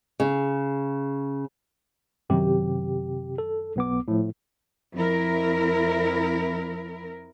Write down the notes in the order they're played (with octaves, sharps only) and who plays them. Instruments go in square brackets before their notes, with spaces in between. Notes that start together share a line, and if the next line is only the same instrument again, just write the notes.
[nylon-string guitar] C#3
[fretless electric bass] F#2 D#3 F#3 [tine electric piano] C3 G4
[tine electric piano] A4
B1 B3 D6
A2 F3
[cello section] F2 E4 A#4